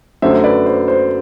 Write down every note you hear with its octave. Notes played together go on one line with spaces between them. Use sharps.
F#2 D3 F#3 A3 C5 E5
E5
B4 D5
C5
C5